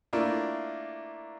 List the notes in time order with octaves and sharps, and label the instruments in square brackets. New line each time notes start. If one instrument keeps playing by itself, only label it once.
[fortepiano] A3 A#3 D4 E4 F4